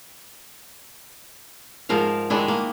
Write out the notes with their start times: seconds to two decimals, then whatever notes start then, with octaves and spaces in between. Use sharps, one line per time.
1.89 G#2 F3 A#4 F5
2.30 D#3 G#3 D4 E4
2.48 A#3